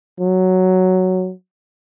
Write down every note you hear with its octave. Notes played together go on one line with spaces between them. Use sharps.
F#3